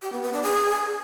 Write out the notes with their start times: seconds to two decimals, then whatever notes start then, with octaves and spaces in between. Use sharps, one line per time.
0.02 G4
0.12 B3
0.23 B3
0.33 D4
0.43 G#4